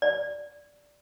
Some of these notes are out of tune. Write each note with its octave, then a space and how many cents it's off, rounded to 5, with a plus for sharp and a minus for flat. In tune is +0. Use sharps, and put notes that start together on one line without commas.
D5 -5